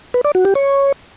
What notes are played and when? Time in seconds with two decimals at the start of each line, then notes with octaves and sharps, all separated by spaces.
0.14 B4
0.25 D5
0.35 F#4
0.45 G4
0.55 C#5